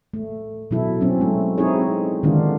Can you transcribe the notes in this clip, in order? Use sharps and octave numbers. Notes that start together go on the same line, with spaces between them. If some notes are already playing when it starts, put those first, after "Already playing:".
A3
B2 F#3 E4 A4
F#3 C4 C#4
G#3 A3
C4 D#4 E4 G#4 C#5
D3 D#3 G#3 B3 D4 F4